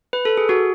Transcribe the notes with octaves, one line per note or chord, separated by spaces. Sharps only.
B4
A4
G#4
F#4